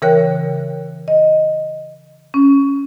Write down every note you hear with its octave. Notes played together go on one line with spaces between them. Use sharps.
C#3 E3 A#4 C#5 G5 F#6
D#5
C#4